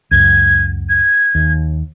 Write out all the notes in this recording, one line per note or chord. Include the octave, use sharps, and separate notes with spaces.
C#2 F#2 G#6
G#6
D#2